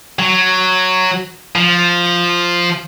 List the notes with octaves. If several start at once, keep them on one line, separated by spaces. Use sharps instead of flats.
F#3
F3